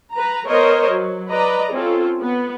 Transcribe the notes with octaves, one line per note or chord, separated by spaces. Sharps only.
B4 A#5
B3 A#4 C5 C#5 D#5
F#3
B4 D5 D#5 A#5
C4 C#4 F4 A4
B3